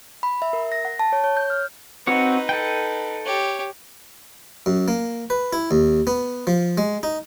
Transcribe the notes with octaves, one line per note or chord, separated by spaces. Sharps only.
B5
E5
A#4
A#6
F#5
A5
C#5
C#5
G6
F6
C4 D#4 F#4 B4 C#5
A4 G5
G4 C#5
F#2
A#3
B4
E4
D#2
B3
F3
G#3
D#4